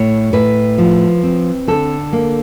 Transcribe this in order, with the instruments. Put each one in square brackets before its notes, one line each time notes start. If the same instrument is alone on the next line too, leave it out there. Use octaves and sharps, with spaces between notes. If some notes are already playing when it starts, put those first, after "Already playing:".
Already playing: [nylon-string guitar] A2 C#5
A2 B4
F3
C4
D3 A4
A#3